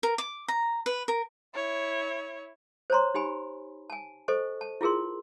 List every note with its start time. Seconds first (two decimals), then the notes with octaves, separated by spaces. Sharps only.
0.03 A#4
0.18 D6
0.48 A#5
0.86 B4
1.08 A#4
1.55 E4 C#5
2.90 C5 C#5 A#5 C6
3.14 D#4 G4 G#5 B5
3.90 G#5 A5
4.28 A4 C5 D#5 C#6
4.61 A5
4.81 E4 F4 G#4 A#4 C6